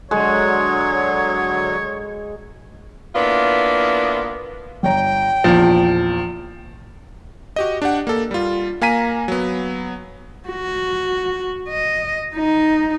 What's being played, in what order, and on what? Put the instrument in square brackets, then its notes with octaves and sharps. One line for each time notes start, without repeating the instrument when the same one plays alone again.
[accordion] D3 F#3 [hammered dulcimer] G#3 [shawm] C#5
[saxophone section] A#3 B3 D4 E4 F4
[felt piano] G1 C#5 A#5 [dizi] G5
[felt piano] A#1 E2 [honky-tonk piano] F3
[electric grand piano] F#4 G4 D#5
D4 G4 F#5
A#3 A4
G3 F4
A#3 F5 G#5 A#5 B6 D#7
F#3 B3
[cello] F#4
D#5
D#4